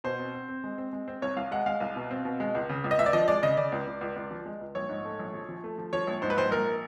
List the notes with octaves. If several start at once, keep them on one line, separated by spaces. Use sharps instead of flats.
B2 C5
C4
C4
C4
G#3
C4
G#3
C4
C2 C#5
C2 F5
G#3 F#5
G#3 F5
C2
B2
C4
B2
G#3
C#2
C#3
C#2
D#5
C#2 E5
D5
F3 D#5
G#3 D5
C#3 D#5
C#3 D5
C#2
C#2
C#2
C#2
F3
G#3
C#2
A#1 C#5
G#2
A3
A#1
F3
F3
A3
F3
F3 C#5
A#1
G#2 C5
B4
A#1 C5
A#1 A#4